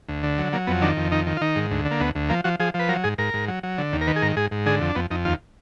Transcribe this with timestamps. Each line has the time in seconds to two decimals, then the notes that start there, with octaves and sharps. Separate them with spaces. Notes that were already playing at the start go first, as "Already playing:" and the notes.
0.08 D2
0.23 D3
0.38 F#3
0.53 F#3 A#3
0.67 F2 B3
0.82 D#3 D4
0.97 F2
1.11 D#3 D#4
1.27 D#3
1.37 F4
1.41 D#3 D#4
1.56 G#2
1.71 D2
1.85 D3
1.91 A#3
2.00 D2 B3
2.15 D2
2.29 F3 A#3
2.44 F3 F#4
2.60 F3 G#4
2.74 F3
2.79 B4
2.89 F#3 A#4
3.04 G#2 G#4
3.18 G#2 A#4
3.34 G#2
3.48 F#3
3.63 F#3
3.78 D3
3.93 D#2
4.01 A#4
4.07 D#3 B4
4.16 G#4
4.22 G#2 A#4
4.36 G#2 G#4
4.51 G#2
4.66 D3 G#4
4.81 F2
4.89 D4
4.95 F2 B3
5.11 F2 D#4
5.25 D#2 F4